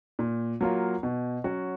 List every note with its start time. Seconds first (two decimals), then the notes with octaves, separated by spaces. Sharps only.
0.19 A#2
0.61 F#3 A#3 F4
1.03 B2
1.44 F#3 C#4 F#4